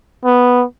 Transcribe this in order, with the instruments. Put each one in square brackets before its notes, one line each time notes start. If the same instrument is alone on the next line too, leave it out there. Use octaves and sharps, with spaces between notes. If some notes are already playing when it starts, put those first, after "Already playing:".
[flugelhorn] B3